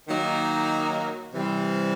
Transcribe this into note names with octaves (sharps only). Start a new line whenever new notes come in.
D#3 F#3 A#3 D#4
C3 E3 G3 C4